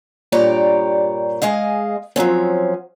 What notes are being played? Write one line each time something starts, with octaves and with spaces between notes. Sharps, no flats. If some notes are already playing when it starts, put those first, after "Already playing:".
G2 A#2 G4 C#5 D5 A#5
G#3 G#4 D#5 F5
F3 F#3 C4 C#4